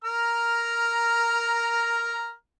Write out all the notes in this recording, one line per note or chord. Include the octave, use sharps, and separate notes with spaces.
A#4 A#5 F6